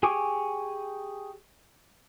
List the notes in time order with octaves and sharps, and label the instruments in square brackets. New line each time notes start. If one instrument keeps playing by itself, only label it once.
[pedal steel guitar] G4 G#4 G#5 C#6 D6